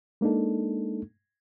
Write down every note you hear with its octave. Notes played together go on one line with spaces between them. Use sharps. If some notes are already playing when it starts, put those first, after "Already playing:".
G#3 A#3 D4 D#4 A4